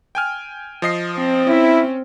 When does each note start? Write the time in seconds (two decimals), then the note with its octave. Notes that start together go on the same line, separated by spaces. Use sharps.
0.15 G5 G#5 F6
0.82 F3 D#5 C7
1.18 C4
1.47 C#4 E4